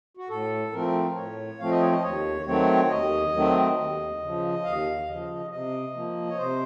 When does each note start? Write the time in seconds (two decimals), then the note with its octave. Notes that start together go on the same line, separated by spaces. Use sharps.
0.17 F#4
0.29 A2 A4
0.73 F3 A3 C4 A#4
1.16 A2 C#5
1.59 F3 A3 C4 F5
1.71 D#5
1.80 C#5
1.91 D#5
2.02 D#2 C#5
2.46 D#3 F#3 A3 C4 C#5
2.89 D#2 D#5
3.33 D#3 F#3 A3 C4
3.77 D#2
4.20 C#3 F3
4.63 D#2 F5
5.06 C#3 F3 D#5
5.50 C3 D#5
5.94 F3 A#3
6.29 C#5
6.37 C3 C5